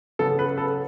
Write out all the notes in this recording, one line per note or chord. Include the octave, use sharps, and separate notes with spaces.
C#3 F#3 B3 A4
B4
A4